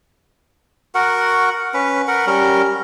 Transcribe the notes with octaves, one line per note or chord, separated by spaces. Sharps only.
F#4 A#4 F#5
C#4 B4
A#4 F#5
G3 C#4 A#4